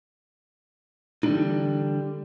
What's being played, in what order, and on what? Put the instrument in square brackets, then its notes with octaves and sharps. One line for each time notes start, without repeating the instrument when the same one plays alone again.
[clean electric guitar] D3 E3 G3 A#3 D4 D#4